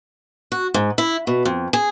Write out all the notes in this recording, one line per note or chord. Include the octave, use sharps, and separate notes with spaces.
F#4
G#2
E4
B2
F2
G#4